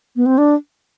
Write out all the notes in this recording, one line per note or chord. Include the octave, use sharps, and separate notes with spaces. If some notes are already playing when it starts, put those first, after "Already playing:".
B3
C4
D4